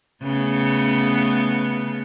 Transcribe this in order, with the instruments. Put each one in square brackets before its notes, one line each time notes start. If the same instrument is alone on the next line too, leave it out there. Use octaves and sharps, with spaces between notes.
[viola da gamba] C#3 A3 B3